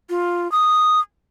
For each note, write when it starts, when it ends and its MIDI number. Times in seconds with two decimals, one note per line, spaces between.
0.10 0.50 65
0.52 0.99 87